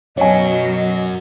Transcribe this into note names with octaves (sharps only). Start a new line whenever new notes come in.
F#2 B2 F#3 F#4 C#5 D#5 G#5